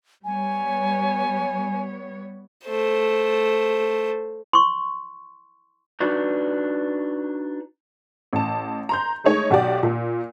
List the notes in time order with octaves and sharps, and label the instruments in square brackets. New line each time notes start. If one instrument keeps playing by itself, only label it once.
[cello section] G3 B3 C#5 [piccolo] G#5
[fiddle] A3 C5
[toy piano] C6 C#6
[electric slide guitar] D4 D#4 F#4 B4
[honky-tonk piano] A1 A5
A#5 C6 G6
G#3 A3 D#4 C#5
B1 F#4 G4 D5
A#2